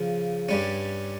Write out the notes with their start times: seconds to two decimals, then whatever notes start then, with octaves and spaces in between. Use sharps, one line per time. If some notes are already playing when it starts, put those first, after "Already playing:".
Already playing: C#3 F3
0.49 G2 G3 C#4